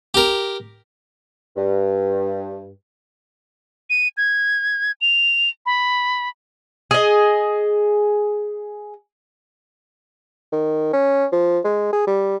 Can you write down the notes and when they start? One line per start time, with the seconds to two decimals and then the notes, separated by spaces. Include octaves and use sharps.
0.14 G4 A#4
1.57 G2
3.90 D#7
4.17 G#6
5.01 F7
5.66 B5
6.91 G#4 D#5
10.52 D#3
10.93 C#4
11.32 F3
11.65 G#3
11.93 G#4
12.07 G3